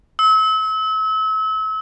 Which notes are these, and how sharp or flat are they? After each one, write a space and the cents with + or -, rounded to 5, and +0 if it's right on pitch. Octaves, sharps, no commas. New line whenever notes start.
E6 -35